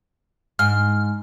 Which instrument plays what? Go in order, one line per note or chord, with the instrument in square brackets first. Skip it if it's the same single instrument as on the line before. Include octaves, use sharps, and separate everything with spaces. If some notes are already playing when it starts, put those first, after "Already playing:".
[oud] G#2 [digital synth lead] F6